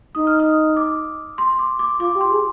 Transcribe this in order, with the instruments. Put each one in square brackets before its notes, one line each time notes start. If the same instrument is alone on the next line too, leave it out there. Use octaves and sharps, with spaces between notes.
[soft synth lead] D#4 [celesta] D#6
[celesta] F6
D#6
D6
C6
D6
D6
[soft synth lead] F4 [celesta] D6
[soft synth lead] G4
[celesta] C6
[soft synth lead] G#4